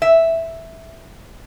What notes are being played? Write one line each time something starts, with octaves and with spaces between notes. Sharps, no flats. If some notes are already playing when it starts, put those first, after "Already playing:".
E5